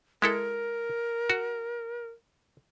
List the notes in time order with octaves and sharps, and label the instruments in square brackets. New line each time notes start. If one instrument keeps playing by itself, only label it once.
[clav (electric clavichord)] G#3 E4 A4 [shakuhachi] A#4
[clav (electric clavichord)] F#4